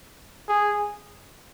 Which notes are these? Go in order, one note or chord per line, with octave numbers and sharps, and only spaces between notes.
G#4